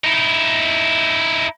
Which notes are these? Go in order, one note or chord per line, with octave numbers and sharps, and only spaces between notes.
D#4 E4